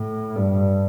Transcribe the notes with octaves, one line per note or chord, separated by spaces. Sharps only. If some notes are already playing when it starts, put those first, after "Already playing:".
Already playing: A2
G2